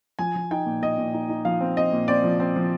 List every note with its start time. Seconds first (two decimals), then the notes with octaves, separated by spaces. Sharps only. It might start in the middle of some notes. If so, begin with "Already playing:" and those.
0.19 F3 G#5
0.35 F3
0.51 D#4 G5
0.66 A#2
0.82 A#2 D#5
0.98 A#2
1.14 D#4
1.29 D#4
1.45 F3 F5
1.61 C4
1.77 C4 D#5
1.92 A#2
2.08 C4 D5
2.24 F3
2.40 C4
2.56 F3